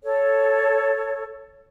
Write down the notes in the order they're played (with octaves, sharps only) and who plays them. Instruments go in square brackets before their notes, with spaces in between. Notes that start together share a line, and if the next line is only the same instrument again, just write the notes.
[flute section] A4 C#5